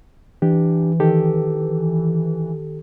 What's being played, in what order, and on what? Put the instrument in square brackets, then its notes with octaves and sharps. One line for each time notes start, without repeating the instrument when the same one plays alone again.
[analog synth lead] E3 [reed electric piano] D4 G4
[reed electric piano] D#3 G4 A4